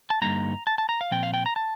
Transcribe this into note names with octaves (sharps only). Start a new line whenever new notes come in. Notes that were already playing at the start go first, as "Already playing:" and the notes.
A5
G2 D3 G3 A#3 D#4 A#5
A5
A5
A#5
F5
A#2 F3 C4 G5
F5
G5
A#5
A5